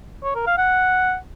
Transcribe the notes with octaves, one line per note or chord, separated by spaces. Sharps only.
C#5
A#4
F5
F#5